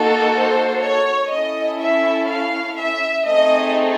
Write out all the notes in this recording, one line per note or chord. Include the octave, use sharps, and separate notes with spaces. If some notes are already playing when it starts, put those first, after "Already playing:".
Already playing: A#3 D#4 F#4 A4
C5
C#5
C#4 E4 A4 D#5
E5
F5
E5
A3 C4 D#4 G#4 D#5